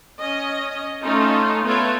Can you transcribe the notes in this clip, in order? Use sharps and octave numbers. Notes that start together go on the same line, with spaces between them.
C#4 D#5
A3 C#4 D#4 F4 A4
A3 B3 F4 A4 B4 C#5